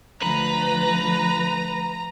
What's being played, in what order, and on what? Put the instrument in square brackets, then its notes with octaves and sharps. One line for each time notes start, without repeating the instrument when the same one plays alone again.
[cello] D2 F3 [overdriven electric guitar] B4 [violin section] A#5